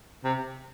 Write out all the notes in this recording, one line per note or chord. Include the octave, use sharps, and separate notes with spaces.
C3